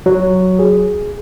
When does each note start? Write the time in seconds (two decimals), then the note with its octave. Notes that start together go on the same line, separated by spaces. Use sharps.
0.06 F#3
0.59 G#4